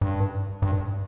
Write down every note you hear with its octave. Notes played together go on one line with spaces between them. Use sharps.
G2
G2